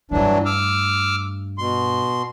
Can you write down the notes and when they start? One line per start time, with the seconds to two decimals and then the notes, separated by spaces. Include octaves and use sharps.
0.11 G2 E3 F#3 A3 D4
0.45 D6 E6 F6
1.58 B2 C6